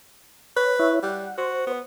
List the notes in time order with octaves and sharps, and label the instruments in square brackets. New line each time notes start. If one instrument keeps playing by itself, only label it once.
[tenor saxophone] B4 [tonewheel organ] C#5
[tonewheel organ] E4 C#5 E5
[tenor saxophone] G3 [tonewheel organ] F#5
[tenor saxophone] F#4 [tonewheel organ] C5
[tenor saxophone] B3